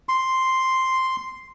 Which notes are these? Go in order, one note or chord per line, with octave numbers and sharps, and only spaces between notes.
C6